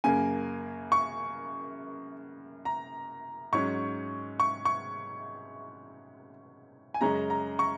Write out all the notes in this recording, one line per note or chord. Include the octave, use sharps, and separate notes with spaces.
F#2 C#3 A#3 G#5
C#6
A#5
G#2 F#3 C#4 C#6
C#6
C#6
G#5
F#2 C#3 G#3 C#4 A#5
A#5
C#6